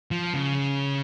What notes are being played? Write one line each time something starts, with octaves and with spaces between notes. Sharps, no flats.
F3
C#3